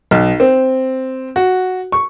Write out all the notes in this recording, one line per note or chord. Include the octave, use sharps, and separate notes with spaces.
B1
C4
F#4
C#6